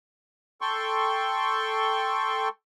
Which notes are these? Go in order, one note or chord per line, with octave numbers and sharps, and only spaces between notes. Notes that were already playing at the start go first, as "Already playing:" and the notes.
A4 G5 C6 C#6